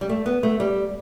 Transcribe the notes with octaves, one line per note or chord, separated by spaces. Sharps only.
G3
A3
B3
A3
G3